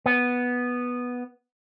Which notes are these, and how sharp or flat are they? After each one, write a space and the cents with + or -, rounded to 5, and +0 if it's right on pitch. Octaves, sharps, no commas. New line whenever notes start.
B3 -5